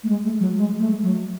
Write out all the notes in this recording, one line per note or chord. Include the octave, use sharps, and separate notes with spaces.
A3
G#3
A3
F#3
G#3
A3
F#3